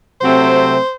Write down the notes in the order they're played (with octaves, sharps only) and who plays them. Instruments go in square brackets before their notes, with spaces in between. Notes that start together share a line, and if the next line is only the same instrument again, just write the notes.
[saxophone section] C3 F#3 A3 C4 [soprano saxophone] C5